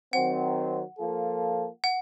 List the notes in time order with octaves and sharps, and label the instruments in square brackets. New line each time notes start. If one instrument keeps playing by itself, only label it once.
[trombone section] D#3 F#3 C4 [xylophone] F#5
[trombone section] F3 A#3 F4 A4
[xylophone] F#5